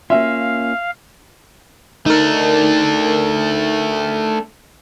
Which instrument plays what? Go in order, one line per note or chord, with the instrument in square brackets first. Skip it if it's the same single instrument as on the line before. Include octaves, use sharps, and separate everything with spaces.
[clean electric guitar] A#3 C#4 F4 [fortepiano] E5 [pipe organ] F5
[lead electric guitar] A3 D4 [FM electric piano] D#4 A#4